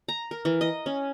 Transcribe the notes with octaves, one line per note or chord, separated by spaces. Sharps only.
A#5
A#4
E3
D#5
C#4